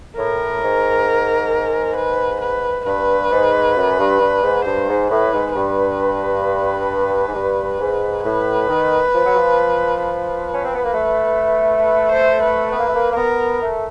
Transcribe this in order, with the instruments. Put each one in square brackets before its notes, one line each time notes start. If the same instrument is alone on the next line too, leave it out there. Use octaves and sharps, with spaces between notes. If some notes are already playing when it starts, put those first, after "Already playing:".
[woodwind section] A2 [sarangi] A#4
[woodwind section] G#2
[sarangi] B4
B4
[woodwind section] G2 [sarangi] B4
[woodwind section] G#2
F#2
G2
G2
G#2
[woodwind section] G2 [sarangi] C5
[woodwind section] G#2
[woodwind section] A2 [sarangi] B4
[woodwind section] G#2
[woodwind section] G2 [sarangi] B4
[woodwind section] G#2
G2
G#2
[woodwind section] A2 [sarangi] B4
[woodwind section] D#3
F3
F#3
F3
[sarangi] B4
[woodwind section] C#4
C4
B3
A#3
A3
[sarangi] B4
C5
B4
[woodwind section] B3 [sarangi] B4
[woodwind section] A#3
A3
A#3
A#3
[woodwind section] B3 [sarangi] A#4
[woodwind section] A3